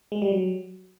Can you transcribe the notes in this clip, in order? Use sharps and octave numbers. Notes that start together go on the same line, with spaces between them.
G#3
G3
F#3